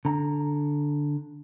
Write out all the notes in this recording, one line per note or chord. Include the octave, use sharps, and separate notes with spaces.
D3 A#5